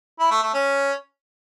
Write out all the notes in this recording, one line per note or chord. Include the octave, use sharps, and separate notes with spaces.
E4
A3
A3
C#4